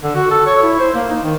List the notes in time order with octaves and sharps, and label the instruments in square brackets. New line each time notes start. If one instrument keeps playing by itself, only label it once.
[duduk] D3
F#4
A4
C#5
E4
C5
A#3
D#4
D#3